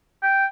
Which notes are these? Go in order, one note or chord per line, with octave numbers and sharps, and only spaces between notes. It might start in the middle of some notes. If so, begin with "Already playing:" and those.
G5